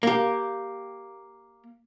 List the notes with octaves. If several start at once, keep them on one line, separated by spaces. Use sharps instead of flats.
A#3 G4